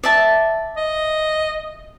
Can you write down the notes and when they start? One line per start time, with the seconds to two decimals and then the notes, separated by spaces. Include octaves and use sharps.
0.04 D5 E5 A5
0.77 D#5